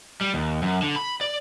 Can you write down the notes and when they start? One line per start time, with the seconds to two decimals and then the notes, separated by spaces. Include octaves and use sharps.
0.21 G3
0.34 D#2
0.62 F#2
0.82 D3
0.96 B5
1.21 D5